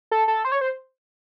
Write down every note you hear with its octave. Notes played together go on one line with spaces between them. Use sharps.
A4
A4
C5
C#5
C5